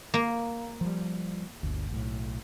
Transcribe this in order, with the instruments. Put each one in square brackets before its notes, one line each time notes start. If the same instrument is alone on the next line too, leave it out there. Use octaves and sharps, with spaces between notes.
[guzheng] A#3
[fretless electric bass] F3 G3
G1 D2
B1 A2